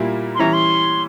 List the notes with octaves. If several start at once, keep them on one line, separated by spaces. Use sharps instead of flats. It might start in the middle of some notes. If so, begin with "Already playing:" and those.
Already playing: A#2 G3 A#3 E4
C6
E3 G3 C#4 E4 A#5
C6